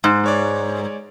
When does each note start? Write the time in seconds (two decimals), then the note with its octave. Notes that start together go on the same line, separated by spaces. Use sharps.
0.04 G#2
0.24 G#3 C#5 D5